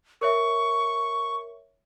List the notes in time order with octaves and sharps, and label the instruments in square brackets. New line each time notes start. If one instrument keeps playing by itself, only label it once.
[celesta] A#4 C#5 E5 [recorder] C#6